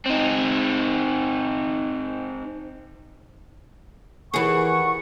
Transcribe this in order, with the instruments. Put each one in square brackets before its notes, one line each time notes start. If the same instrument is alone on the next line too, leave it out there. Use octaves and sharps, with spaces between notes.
[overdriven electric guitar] C4 D#4
[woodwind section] D#2 F#5 C#6 [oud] E3 G#4